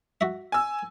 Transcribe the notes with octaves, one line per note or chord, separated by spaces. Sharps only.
F#4 E5
G#5 E6